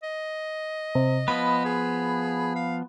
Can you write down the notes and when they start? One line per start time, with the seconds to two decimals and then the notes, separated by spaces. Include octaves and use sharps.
0.03 D#5
0.95 C3
1.28 F3 B3 B5
1.65 G#4
2.56 F5